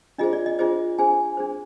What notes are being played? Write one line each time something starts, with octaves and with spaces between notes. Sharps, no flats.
D4 F4 G#4 C5 D#5
D5
D#5
D4 F4 G#4 C5 D#5
D4 G#4 C5 G#5
D4 G#4 C5